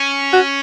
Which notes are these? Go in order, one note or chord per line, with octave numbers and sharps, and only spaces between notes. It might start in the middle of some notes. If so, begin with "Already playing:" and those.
Already playing: C#4
F#4